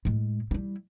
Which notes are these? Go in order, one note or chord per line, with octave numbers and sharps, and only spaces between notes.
A2 G#3
G3 E4